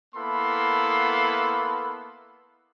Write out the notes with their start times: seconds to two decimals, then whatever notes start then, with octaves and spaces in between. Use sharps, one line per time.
0.15 A#3 B3 E4 A4 B5 C6